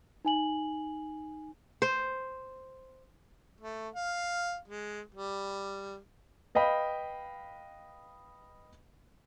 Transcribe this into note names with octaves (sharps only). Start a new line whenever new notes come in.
D#4 G#5 F#7
C5
A3
F5
G#3
G3
B4 D#5 F5 G5 B5